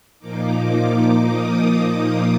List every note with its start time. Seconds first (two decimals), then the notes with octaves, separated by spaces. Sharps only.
0.19 A#2 F3 A#3 D#4 D6
0.73 D6
1.24 D#6
1.78 D6